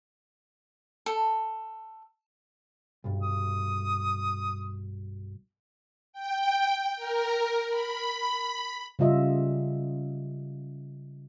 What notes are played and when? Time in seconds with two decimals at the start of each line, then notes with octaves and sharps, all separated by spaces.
1.06 A4
3.04 B1 G2
3.23 D#6
6.13 G5
6.96 A#4
7.69 B5
8.99 C#3 G3 F4 D#5 E5